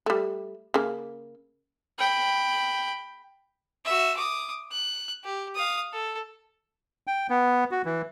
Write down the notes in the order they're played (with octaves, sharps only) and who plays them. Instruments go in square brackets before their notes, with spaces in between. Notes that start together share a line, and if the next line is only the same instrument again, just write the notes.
[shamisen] G3 A3
C#3 A#3
[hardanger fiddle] G5 B5
[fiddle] F#4 E5
D6 D#6
F#6
G4
F5 D#6
A4
[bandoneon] G5
B3
F#4
E3